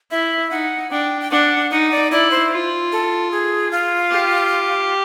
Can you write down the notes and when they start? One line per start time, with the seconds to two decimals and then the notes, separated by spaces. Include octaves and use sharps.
0.11 E4 E5
0.51 D#4 F#5
0.91 D4 G5
1.21 G5
1.31 D4 F#5
1.71 D#4 F#5
1.91 D5
2.12 E4 D5
2.31 C5
2.52 F4
2.92 A4
3.31 G#4
3.71 F4
4.11 G4